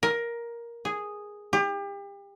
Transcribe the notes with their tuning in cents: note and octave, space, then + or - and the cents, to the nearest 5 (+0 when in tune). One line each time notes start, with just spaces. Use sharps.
A#4 +10
G#4 -5
G4 +35